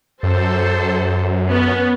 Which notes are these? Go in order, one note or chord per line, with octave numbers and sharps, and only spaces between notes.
F#2 A4 C5
B3 C#4